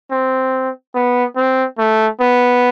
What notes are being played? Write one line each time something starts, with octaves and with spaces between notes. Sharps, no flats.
C4
B3
C4
A3
B3